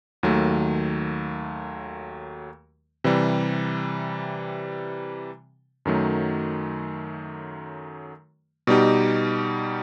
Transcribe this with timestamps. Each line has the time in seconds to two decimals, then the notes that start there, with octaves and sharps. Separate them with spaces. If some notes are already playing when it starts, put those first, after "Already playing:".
0.23 D#2 D#3 F#3 A3
3.04 C3 E3 G3
5.85 F#2 D#3 F#3 A3
8.67 B2 G3 D#4 G4